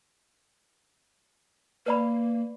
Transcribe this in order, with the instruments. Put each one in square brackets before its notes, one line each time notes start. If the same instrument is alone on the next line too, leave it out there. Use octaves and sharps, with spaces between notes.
[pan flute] A#3 [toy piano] B4 D5 B5